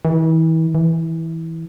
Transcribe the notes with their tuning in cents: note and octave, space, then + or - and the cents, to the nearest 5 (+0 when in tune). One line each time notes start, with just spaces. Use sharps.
E3 -35
E3 -15